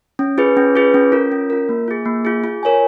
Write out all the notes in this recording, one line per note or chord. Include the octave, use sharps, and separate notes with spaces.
C#4
F4 G#4 B4
C#4
F4 G#4 B4
C#4
F4 A#4
C#4
F4 A#4
A#3
F4 G#4
A#3
F4 G#4
F4
A#4 C#5 G#5